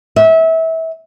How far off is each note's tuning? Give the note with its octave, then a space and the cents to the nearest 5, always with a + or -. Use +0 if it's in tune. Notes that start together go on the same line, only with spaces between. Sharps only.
E5 -25